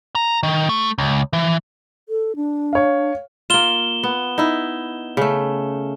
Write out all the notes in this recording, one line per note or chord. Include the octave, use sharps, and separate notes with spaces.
A#5
D#3
A3
C#2
E3
A4
D4
C#5 F5
A#3 F4 E7 G7
B3
D#4 E4
C#3 A3